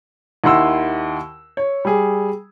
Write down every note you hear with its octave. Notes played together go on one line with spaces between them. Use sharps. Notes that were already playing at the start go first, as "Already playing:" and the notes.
D#2 D#3 E4 F#5 C6 E6
C#5
G3 G#4